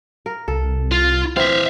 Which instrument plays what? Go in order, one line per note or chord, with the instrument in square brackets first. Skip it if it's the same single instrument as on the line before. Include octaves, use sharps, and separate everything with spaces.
[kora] A#4
[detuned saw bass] C2 [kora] A4
[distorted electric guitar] F4
[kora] E3 C4 [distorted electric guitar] E5 F5